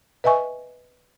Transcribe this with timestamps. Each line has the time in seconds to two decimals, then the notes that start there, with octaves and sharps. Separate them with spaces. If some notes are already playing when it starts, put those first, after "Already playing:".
0.24 B4 D#5 E5 G#5 C#6